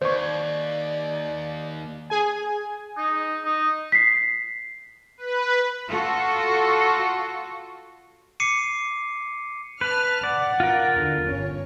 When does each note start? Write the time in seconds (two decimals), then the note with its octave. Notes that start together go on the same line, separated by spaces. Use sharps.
0.02 D#2 C5 D5 C#6
2.10 G#4 G#5
2.97 D#4
3.45 D#4
3.92 B6 C7
5.17 B4
5.90 F4 F#4 A4
8.40 D6 C7 C#7 D#7
9.81 B4 A5 F6
10.23 D5 F#5
10.60 F4 A#4
10.95 E2 D3
11.24 G1 C#4 C#5